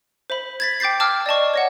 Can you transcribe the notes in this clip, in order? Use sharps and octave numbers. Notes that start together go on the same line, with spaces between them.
C5 E5 B5
G#6 A6 B6
G5 D6 G6 A6 C7
A5 D6 E6 F6
D5 D#5 A5 C#6
C#5 D#5 F#5